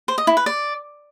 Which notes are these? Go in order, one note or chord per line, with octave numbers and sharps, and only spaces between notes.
C5
D#5
E4
B4
D5